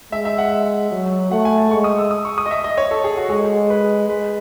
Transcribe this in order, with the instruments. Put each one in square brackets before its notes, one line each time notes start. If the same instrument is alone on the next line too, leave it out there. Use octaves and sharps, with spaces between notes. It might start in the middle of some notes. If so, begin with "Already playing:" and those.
[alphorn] G#3 [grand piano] E5
[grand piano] E5
F#5
[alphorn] F#3
[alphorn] A3 [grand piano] F#5
[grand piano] G#5
A5
[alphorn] G#3 [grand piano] C#6
[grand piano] D#6
E6
D#6
C#6
D#6
D#5
E5
D#5
C#5
A4
G#4
F#4
[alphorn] G#3 [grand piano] G#4
[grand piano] B4
[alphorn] G#3 [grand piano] B4